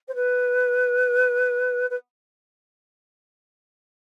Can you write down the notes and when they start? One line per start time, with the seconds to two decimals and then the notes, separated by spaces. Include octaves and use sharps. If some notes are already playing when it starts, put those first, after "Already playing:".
0.08 C5
0.15 B4
1.90 B4